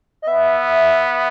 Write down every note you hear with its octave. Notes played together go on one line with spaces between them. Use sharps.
D#5
B3 E5